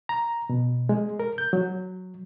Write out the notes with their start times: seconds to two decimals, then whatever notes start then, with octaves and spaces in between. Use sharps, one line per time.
0.09 A#5
0.49 B2
0.89 G#3
1.19 A#4
1.38 G6
1.53 F#3